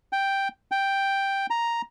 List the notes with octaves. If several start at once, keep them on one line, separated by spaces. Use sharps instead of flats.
G5
G5
A#5